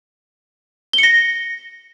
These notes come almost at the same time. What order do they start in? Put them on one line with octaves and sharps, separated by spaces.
G7 C#7 A#6